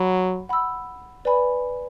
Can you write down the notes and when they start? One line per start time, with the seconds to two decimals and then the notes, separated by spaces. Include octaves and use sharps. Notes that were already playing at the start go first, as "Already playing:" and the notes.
Already playing: F#3 F#5 B5
0.49 F#5 B5 E6
1.25 B4 D5 G#5 B5